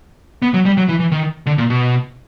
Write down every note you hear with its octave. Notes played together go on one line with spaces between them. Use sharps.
B3
F#3
G3
F#3
E3
E3
D#3
D3
A#2
B2